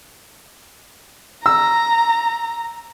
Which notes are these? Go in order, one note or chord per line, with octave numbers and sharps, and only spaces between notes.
A#5 E6